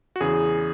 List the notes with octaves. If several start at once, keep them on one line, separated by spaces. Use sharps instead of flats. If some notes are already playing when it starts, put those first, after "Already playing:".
F#4
E2 C#3 E3 G#4